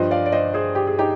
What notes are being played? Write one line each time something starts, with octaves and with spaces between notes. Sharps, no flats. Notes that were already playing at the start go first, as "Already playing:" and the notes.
Already playing: G2 F3 C5 D#5
D5 F5
D5
C5 D#5
G#4 C5
G4
G#4
D#4 G4